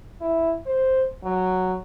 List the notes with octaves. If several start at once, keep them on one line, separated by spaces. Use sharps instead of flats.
E4
C5
F#3